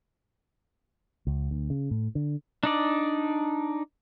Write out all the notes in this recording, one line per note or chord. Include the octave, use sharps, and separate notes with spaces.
C#2
D2
C#3
A2
D3
D4 D#4 D5